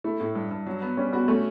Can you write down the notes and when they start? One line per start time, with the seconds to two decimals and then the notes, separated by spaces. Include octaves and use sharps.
0.04 A3 E4
0.20 A2
0.35 G2
0.51 G2
0.66 F#3
0.82 B3
0.97 G3 C#4
1.13 B3 F#4
1.28 A3 C#4